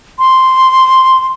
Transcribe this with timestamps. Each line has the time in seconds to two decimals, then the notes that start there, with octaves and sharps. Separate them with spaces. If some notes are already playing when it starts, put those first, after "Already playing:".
0.19 C6